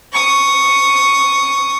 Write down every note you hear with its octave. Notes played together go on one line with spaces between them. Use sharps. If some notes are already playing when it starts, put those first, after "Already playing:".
C#6 D#6